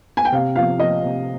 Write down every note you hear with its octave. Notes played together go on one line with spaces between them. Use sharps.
G#5
G5
C3 F5
F3 F5
F3 D#5
C3